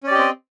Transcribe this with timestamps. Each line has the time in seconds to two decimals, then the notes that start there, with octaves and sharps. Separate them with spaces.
0.03 C#4
0.07 D5
0.11 G4
0.15 D#5
0.18 C4